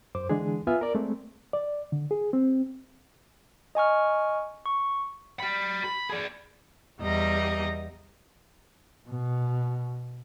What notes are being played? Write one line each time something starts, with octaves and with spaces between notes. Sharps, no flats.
F#2 C5 D6
D3 E3 G#3 D4 G#4
B3 F4 B4 E5 G#5 F6
A#4 D5
G#3 A3 C4
D5
D3
G#4
C4
D#5 G#5 C#6 F6
C#6
G4 B5
B5
G#4 D5
E2 G3 D#5 A#5
B2